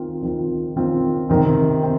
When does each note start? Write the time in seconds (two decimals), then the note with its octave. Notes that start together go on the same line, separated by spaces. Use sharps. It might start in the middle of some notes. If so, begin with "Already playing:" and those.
Already playing: D#3 C4 F4
0.22 D#3 C4 F4
0.76 D#3 C4 F4
1.29 C3 D#3 C4
1.83 C4